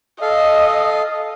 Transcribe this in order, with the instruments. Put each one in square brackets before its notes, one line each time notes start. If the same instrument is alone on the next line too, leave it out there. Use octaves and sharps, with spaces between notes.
[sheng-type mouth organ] A4 F5 [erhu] D#5